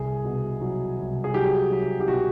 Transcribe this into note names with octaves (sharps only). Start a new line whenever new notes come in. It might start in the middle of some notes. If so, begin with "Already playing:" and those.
Already playing: C2 G#4
B2
F#3
C2
G#4
F#3 G4
F#3
G4
B2 F#4